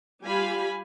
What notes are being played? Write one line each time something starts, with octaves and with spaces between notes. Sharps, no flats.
G3 F4 G4 F5 G#5 B5